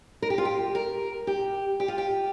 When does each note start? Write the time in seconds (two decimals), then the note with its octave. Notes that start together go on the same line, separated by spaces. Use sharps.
0.22 A#4
0.30 G4
0.38 F4
0.45 G4
0.75 A#4
1.27 G4
1.80 G4
1.88 F4
1.98 G4